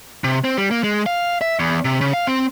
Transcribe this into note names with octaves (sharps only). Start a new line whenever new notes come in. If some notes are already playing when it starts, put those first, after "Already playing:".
C3
C4
G3
A#3
G#3
F5
E5
E2
C3
C#3
F5
C4